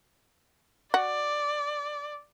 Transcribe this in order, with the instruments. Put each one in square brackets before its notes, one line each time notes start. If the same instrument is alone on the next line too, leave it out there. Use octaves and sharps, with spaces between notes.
[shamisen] F#4 [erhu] D5